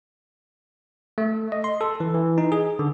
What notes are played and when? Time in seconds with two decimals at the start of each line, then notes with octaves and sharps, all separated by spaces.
1.18 A3
1.52 D#5
1.64 C6
1.81 A4
2.00 E3
2.15 E3
2.38 D#4
2.52 G#4
2.79 D3